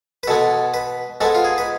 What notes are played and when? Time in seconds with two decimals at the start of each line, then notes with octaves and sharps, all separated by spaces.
0.23 B4
0.27 B2 G#3 B3 A4
0.74 B4
1.21 G#2 G#3 B3 A4
1.35 F4
1.44 G#4
1.58 B4